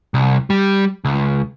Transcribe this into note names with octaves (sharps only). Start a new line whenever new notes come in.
C2
G3
C#2